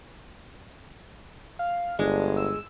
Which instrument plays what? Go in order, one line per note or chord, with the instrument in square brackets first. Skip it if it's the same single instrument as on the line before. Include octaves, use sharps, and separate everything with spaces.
[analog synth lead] F5
[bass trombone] G1 [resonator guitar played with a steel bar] G#3 [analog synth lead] D4
[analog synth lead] E6